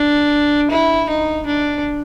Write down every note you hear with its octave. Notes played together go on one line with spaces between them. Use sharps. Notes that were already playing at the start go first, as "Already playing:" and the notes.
Already playing: D4
E4
D#4
D4